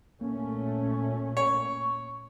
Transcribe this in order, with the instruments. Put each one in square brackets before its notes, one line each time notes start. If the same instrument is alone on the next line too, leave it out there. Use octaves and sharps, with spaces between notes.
[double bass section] A#2 A3 C#4 [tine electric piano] A#3
[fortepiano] C#5 [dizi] C#6